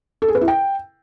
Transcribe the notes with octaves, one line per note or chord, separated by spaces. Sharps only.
A4
G#4
B4
E4
G5